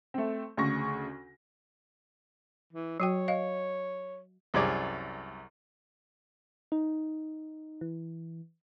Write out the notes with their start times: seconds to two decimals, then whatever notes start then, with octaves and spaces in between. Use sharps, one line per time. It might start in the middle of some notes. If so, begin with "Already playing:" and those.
0.14 A3 C4
0.57 D2 C#3 C#6 A#6
2.73 E3
3.00 F#3 F#4 C#5 G5
3.28 D#5 F5
4.54 C2 F#2 G3 G#4 D5
6.72 D#4
7.81 E3